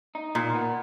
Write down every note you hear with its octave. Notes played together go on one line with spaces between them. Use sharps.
D#4
A#2 D#3
B3